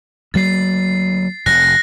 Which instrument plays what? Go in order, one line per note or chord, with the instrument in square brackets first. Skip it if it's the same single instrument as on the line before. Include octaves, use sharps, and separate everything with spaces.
[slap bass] D2 F#3 A#3 [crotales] A6 C7
[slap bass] F1 F2 [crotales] F#6 A#6